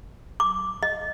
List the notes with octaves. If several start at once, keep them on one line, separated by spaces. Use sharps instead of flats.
D6
D#5